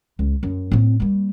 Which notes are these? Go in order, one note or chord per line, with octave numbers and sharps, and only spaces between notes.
C#2
F#2
A2 C4
G3 A#3